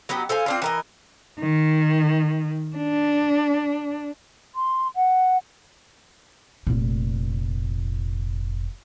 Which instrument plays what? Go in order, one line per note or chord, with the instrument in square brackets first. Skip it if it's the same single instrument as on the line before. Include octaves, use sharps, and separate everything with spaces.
[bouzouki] F#3 B3 D#4 G4
A4 C5 F5 G#5
C4 D4 F4
E3 A#4 D#5
[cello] D#3
D4
[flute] C6
F#5
[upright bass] F1 A#2